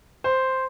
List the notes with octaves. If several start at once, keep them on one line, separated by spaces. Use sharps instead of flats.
C5